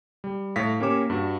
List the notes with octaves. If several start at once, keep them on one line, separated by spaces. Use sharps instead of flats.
G3
A2 F5 A#6 B6
A#3 C#4 G4 C#5 D6 E7
G2 F#4